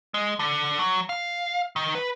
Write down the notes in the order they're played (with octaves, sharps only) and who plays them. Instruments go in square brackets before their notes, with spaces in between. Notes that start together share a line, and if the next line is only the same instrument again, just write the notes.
[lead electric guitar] G#3
D3
F#3
F5
D#3
B4